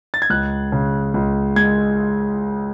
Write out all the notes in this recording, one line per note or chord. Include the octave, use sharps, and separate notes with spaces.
A6
G#6
C#2 F#6
C#3
C#2
G#3 G#6